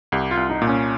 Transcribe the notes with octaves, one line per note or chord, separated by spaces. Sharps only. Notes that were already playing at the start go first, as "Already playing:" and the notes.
C2 G4
F4
C2
D#4
A#2
C#4